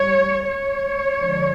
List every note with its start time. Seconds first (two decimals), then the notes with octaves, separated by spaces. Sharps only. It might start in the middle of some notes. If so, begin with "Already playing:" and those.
Already playing: G3 C#5
0.47 C#5
1.19 D3 F3 G#3